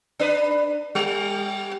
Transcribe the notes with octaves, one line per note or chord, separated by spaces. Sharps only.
D4 B4
G3